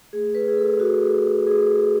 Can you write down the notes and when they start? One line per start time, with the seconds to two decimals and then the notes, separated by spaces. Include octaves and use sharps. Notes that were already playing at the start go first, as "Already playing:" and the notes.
0.13 A3 G#4
0.35 B4
0.48 G#4
0.57 A3 A4
0.80 F#4
1.02 A3 G#4
1.47 A3 G#4